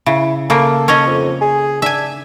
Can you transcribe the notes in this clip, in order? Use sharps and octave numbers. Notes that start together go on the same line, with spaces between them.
C#3 E4
C#3 A#3 A4
C#4 C#5 D#5
F2
G#4
D4 E5 G#5